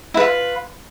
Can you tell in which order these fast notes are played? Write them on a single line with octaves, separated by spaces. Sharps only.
E4 B4 F4